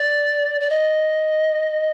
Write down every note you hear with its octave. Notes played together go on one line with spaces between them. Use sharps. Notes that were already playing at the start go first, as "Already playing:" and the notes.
Already playing: D5
D5
D#5